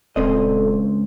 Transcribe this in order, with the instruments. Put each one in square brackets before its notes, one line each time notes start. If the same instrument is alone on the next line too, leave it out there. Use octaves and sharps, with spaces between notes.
[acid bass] D#1 [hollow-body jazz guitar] C#2 C4 D#5 [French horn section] A4